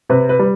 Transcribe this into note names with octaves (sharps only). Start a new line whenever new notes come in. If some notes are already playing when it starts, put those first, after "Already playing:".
C3 B4
B4
G3